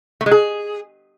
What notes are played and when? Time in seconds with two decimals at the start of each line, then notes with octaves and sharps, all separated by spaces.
0.21 A3
0.26 G#3
0.31 G#4